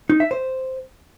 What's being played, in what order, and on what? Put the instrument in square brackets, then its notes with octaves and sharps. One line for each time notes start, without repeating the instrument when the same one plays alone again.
[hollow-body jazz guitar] D#4
E5
C5